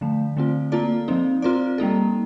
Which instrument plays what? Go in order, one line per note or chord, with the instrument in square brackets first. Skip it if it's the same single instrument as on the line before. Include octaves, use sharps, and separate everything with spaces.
[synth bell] D3 F3 A3
D3 A3 C4 F4
A#3 F4 A4 D5
F3 C4 D#4
C4 F4 A#4 D5
G3 A#3 D#4 A4